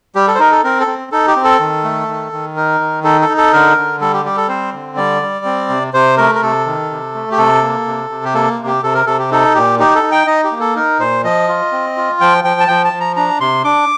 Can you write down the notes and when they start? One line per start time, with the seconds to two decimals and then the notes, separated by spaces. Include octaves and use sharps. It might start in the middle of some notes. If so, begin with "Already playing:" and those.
0.15 G3 G4
0.28 A4
0.35 C5
0.39 D#4 A#4
0.51 A4
0.64 C4 A#4
0.80 A4
0.87 C4
1.12 D#4 A4
1.27 G4
1.36 C4
1.44 A4
1.60 D#3
1.84 A3
2.08 D#3
2.33 D#3
2.56 D#4 A#4
2.80 D#3
3.04 D#4 A4
3.21 A4
3.29 D#4
3.37 A4
3.53 D3 A#4
3.77 D3
4.01 G3 A4
4.14 G4
4.24 G3 G4
4.37 A4
4.49 C4 C5
4.73 D3
4.97 G3 D5
5.22 G3
5.45 C4
5.69 C3
5.94 C3 C5
6.17 A3 A#4
6.35 A#4
6.42 C3 A4
6.66 D#3
6.91 C3
7.14 A3
7.32 G4
7.38 C3 A4
7.63 A#3
7.87 C3
8.10 C3
8.25 G4
8.34 A#3 A4
8.59 C3
8.67 G4
8.83 C3 A4
8.94 A#4
9.06 C3 A4
9.19 G4
9.31 D#4 A4
9.55 A#2 G4
9.79 D#4 G4
9.95 A4
10.03 D#4
10.12 G5
10.27 D#4 D#5
10.44 G4
10.52 A#3
10.60 A4
10.76 D#4 A#4
10.99 A#2 C5
11.24 F3 D#5
11.49 F4
11.72 C4
11.97 F4
12.21 F3 G5
12.44 F3 G5
12.60 A5
12.68 F3 G5
12.85 A5
12.93 F3
13.00 A#5
13.16 D4 A#5
13.41 C3 C6
13.64 D4 D6